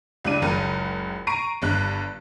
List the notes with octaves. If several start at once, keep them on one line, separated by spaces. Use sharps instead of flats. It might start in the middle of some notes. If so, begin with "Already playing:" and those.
C#2 G3 D4 D#7
F#1 C#2 A#4
A#5 C#6 C7 D7 D#7
G1 G2 F#6